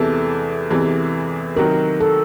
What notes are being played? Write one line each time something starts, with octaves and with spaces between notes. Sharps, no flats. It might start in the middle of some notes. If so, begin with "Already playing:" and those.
Already playing: E2 C3 E3 G#3 A4
E2 C3 E3 G#3
C3 D#3 F#3 A#4
A4